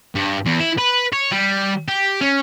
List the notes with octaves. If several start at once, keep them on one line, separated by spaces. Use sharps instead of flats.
G2
E2
E4
B4
C#5
G3
G4
C#4